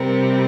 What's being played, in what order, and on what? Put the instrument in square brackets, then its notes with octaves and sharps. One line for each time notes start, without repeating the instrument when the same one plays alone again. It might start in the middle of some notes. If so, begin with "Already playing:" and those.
Already playing: [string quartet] C3 G3 C4 A#4